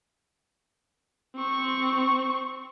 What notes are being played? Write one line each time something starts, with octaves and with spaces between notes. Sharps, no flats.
C4 C#6